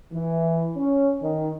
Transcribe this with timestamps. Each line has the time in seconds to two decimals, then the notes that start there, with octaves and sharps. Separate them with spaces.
0.12 E3
0.77 C#4
1.20 D#3